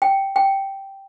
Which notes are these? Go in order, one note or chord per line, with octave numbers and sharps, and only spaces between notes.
G5
G5